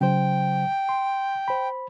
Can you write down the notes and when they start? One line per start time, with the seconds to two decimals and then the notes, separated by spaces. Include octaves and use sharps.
0.01 C#3 F#3 C5 G5
0.89 C6
1.48 C5 B5